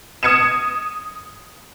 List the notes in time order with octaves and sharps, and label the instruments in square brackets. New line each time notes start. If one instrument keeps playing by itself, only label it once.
[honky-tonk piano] D#6 G#6 C#7 D#7 E7